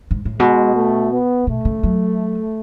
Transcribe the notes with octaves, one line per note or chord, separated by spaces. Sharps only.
G#2
A2
B2 G#3
A3
B3
B2 A3
C#3
F#3